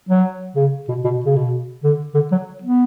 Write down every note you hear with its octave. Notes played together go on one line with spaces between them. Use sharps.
F#3
C#3
B2
B2
C#3
B2
D3
D3
F#3
B3